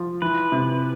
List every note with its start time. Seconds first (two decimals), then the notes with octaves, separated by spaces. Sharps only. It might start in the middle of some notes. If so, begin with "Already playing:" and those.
Already playing: F3
0.22 E3 B4
0.52 C3